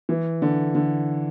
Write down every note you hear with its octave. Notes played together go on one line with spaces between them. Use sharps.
E3
D3
D3